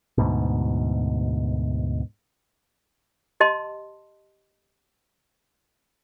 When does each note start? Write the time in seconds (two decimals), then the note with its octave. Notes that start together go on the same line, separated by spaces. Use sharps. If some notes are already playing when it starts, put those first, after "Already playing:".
0.18 D2 G#2 B2
3.40 G4 D#5 A5 C6